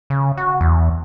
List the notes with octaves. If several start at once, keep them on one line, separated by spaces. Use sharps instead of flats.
C#3
F#4
E2